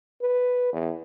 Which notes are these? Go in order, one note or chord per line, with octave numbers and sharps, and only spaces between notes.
B4
E2